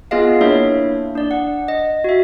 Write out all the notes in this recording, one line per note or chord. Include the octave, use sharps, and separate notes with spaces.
B3 F4 G#4 D#5 F5
A#3 D4 E4 C#5 E5
D4 D5
F#5
D#5
F#4 E5